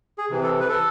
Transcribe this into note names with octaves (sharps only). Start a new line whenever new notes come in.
G#4
C3 E3
A4
B4
A4